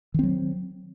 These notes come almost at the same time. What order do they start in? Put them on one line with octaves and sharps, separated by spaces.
D#3 C4 F#3